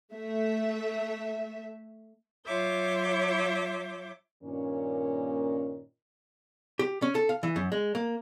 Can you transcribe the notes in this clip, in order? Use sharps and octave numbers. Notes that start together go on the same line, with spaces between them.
A3 E5
F#3 F4 C#5 E5 D6 G6
G2 A#2 D#3 A#3 C#4
G4
C#4
A4
F5
E3
F#2
G#3
A#3